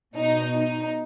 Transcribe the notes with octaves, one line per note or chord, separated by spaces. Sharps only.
B2 D#4
D#4